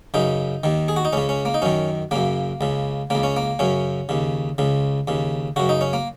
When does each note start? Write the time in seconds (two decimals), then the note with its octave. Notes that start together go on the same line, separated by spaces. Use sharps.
0.14 F#2 C#3 D#4
0.64 D#2 D#3
0.88 G#4
0.96 F#4
1.05 D#4
1.13 C#2 C#3 C#4
1.29 C#4
1.45 A#3
1.54 D#4
1.62 F#2 D#3 C#4
2.11 F#2 C#3 A#3
2.61 C#2 C#3
3.10 C#2 C#3 A#3
3.23 C#4
3.36 A#3
3.59 F#2 C#3 C#4
4.09 D#2 C#3
4.58 C#2 C#3
5.08 D#2 C#3
5.56 F#2 C#3 F#4
5.69 D#4
5.81 C#4
5.93 A#3